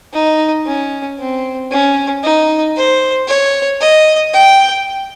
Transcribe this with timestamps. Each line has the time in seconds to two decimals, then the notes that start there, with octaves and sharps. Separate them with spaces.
0.13 D#4
0.66 C#4
1.19 C4
1.71 C#4
2.23 D#4
2.76 C5
3.28 C#5
3.81 D#5
4.34 G5